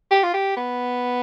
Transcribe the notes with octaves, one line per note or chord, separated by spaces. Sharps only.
G4
F4
G4
B3